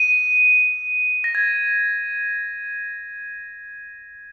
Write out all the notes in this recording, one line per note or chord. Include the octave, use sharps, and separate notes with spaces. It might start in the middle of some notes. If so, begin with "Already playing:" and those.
Already playing: D#7
A#6
G#6